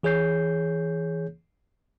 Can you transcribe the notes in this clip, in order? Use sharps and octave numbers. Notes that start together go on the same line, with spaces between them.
E3 G#4 C#5 G6 C7